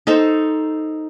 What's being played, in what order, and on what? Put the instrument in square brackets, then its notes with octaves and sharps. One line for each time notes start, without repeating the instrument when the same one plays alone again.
[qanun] D#4 A4 C5